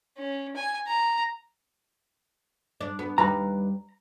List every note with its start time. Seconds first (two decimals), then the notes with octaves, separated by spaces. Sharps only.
0.17 C#4
0.56 G#5
0.88 A#5
2.81 D4
2.99 B3
3.18 D#2 G3 B4 A#5